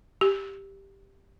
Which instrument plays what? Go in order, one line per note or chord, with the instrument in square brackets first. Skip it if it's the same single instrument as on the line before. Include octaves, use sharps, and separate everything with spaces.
[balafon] G4